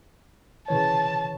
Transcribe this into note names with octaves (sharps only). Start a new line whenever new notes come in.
C#3 E3 C#5 A5